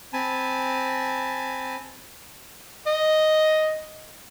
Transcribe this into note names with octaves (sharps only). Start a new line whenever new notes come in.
C4 G#5 A5 B5
D#5